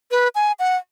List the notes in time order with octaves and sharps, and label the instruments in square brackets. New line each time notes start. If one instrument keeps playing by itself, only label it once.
[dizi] B4
G#5
F#5